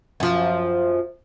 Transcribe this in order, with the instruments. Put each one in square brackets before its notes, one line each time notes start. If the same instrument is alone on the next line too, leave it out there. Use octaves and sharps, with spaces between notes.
[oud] F#2 F3